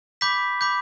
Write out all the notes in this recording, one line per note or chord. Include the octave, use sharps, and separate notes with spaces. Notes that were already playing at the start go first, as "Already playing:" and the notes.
B5 D6 G6 B6
B5 D6 G6